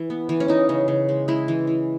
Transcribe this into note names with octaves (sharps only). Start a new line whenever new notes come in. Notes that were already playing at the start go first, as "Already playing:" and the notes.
Already playing: E3
B3
E3
C#4
E3 D#4
C#3
C#3
G#3
G#3 E4
E3
E3